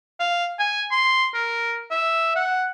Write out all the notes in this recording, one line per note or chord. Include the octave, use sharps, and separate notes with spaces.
F5
G#5
C6
A#4
E5
F#5